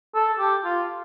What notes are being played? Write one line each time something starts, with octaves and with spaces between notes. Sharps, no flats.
A4
G4
F4